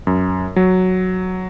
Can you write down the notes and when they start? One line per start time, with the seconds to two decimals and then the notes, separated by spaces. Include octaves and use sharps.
0.07 F#2
0.56 F#3